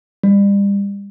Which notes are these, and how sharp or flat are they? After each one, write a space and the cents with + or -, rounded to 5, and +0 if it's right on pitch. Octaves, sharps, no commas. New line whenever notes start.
G3 +35